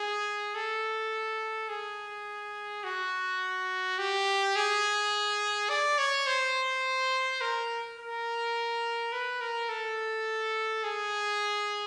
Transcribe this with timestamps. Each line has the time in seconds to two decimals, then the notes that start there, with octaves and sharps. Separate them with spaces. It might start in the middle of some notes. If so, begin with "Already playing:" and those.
Already playing: G#4
0.55 A4
1.69 G#4
2.84 F#4
3.99 G4
4.56 G#4
5.70 D5
5.98 C#5
6.27 C5
7.41 A#4
7.98 A#4
9.12 B4
9.41 A#4
9.69 A4
10.84 G#4